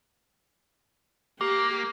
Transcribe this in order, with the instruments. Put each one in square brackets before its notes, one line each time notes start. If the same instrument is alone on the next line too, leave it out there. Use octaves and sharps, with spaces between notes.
[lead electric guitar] A#3 [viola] G4